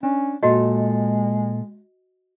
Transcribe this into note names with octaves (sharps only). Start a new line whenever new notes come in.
C#4 D4
A#2 G#3 F#4 A4 D#5